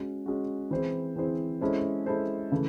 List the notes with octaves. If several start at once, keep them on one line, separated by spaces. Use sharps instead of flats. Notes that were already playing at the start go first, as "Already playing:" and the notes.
Already playing: G#3 C#4 F#4
G#3 C#4 F#4
E3 C4 E4 G#4 C5
E3 C4 E4 G#4 C5
G#3 C#4 E4 A4 C5
G#3 C#4 E4 A4 C5
C#3 E3 A3